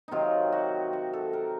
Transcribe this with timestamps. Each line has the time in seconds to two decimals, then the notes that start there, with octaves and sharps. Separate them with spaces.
0.08 C3 D#3 F#3 D#4 F4
0.53 F#4
0.93 F#4
1.13 A4
1.33 A#4